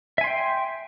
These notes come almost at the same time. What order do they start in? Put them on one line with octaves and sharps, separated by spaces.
E5 G#5 C6 G5